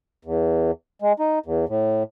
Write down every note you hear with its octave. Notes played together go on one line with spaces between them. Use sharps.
E2
G#3
D#4
E2
A2